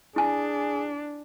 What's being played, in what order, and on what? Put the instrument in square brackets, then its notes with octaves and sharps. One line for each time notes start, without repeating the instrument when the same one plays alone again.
[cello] D4 [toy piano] E4 G#5 [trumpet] G#4